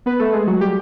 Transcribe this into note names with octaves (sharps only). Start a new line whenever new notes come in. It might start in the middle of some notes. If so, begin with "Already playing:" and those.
B3 B4
A3 A4
G#3 G#4
F#3 F#4
G3 G4